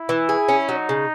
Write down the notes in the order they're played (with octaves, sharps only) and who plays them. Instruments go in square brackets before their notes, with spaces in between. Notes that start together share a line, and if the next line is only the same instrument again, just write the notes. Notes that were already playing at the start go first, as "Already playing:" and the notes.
Already playing: [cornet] E4
[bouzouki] E3
G#4
C#4
[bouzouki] F#3 [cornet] D#4
[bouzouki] C#3